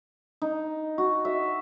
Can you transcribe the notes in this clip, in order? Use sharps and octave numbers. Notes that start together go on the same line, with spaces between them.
D#4
F#4
E5